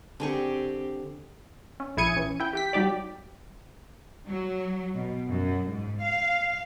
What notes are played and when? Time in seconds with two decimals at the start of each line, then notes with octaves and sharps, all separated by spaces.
0.20 D3 C4 G4 G#4 C#6
1.80 C#4
1.97 A#1 E4 G#4 G#6 C#7 D#7
2.17 E3 C#4
2.40 E4 G5
2.53 G4 G5 B6
2.73 F#3 G3 D#4 G4 D5
4.26 F#3
4.94 B2
5.27 F#2
5.67 G#2
6.00 F5